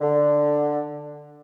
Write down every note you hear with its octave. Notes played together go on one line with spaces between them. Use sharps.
D3